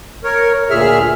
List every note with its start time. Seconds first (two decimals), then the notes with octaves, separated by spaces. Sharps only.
0.24 A#4 C#5
0.70 D2 A#2 G#4 E5 F6